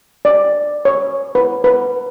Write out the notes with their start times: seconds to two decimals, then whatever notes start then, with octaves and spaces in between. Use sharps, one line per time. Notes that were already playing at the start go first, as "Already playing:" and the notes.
0.25 D5
0.85 C#5
1.35 B4
1.64 B4